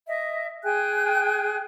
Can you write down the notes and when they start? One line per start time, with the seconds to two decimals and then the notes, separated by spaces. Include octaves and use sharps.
0.07 D#5 E5
0.63 G#4 G5 G#5 F#6